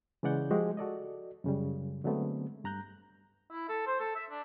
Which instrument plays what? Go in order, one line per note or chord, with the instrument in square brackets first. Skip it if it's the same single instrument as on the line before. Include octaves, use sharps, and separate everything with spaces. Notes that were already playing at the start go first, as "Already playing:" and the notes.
[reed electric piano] C#3 E3 G#3 D5 F#5 G6
F3 G#3 F#4 G4
F#4 A4 D5 D#5
F#2 C#3 G3
D3 F#3 G#3 A3 B3 C4
G2 A#5 F#6 G6
[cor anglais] E4
A4
C5
A4
E5
D4